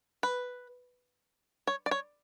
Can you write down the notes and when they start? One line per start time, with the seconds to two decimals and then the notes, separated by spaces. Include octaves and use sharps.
0.23 B4
1.67 C#5
1.86 D5
1.91 C#5